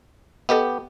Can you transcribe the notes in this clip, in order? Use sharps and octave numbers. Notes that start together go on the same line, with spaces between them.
B3 G4 A4 D#5